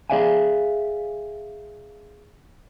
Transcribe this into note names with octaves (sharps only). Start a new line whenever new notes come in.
G#4 A4 D5 E5 F5 G#5